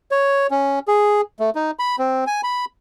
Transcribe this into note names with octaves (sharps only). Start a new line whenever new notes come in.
C#5
C#4
G#4
A3
D#4
B5
C4
G#5
B5